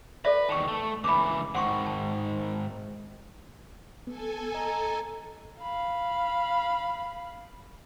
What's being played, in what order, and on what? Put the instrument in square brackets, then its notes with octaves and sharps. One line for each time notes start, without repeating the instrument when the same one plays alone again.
[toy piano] A4 D5 E5 [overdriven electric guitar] B4
[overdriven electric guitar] E2 D#3 [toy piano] A5 C#6
[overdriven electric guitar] A3
[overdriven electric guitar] C#2 E3 [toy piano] B5 D6
[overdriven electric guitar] G#2 D#3 [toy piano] F#5 C6 C#6
[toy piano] A5
[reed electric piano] B3 [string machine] A4 G#5
[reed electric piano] D#5 [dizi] A#5
[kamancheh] F5 B5